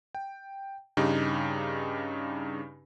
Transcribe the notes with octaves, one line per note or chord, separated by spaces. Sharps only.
G5
G2 C#3 D#4 G4